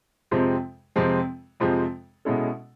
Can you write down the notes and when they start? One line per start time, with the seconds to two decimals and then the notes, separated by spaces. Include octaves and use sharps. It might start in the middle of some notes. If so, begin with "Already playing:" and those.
0.31 F2 C3 F3 G#3 C4
0.96 F2 C3 F3 G#3 C4
1.60 F2 C3 F3 G#3 C4
2.25 B2 G#3 C#4 E4 A4